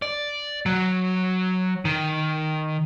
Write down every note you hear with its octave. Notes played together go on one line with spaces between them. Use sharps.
D5
F#3
D#3